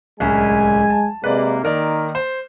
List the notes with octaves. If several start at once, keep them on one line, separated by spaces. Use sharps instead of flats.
D1 C2 G#3 C#4 G#5
A5
C3 G#3 A#3 B4 D5
D#3 A#3 A#4 D5
C5